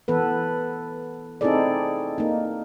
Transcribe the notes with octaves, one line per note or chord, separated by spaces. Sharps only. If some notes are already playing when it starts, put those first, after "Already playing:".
E3 B3 A4 B4
C4 D#4 E4 G#4 A4 D5
A#3 D#4